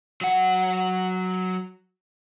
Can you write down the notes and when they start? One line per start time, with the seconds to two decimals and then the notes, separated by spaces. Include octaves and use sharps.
0.21 F#3 F#5